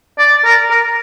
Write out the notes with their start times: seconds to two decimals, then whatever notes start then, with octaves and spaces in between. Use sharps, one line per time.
0.19 D5
0.45 A#4
0.71 A#4